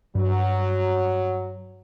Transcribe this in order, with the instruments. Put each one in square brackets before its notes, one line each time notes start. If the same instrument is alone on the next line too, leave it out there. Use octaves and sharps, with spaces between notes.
[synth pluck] G2 [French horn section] F#3